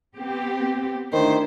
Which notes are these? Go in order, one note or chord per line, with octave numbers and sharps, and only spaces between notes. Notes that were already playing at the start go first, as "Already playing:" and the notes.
B3 C4 G4
D2 D#3 D4 E4 C5